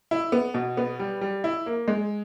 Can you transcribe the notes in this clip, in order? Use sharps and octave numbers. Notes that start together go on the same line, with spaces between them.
E4
B3
B2
B3
G3
G3
E4
A#3
G#3